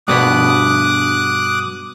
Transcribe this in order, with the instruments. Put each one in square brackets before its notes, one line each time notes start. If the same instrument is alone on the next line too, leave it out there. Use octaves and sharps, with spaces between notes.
[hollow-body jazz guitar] G2 B2 B3 [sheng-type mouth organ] D6 D#6 F#6